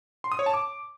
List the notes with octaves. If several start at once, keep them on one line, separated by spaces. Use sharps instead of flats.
C6
D#6
C#5
A5
D6